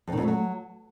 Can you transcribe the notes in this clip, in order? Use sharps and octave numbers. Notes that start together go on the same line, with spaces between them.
F2
D#3
F2
A3
F#3